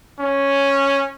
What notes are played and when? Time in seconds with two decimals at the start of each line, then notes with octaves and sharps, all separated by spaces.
0.20 C#4